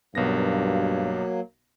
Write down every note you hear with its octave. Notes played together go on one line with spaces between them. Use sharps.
B1 G2 F#3 A#3 B3 A#6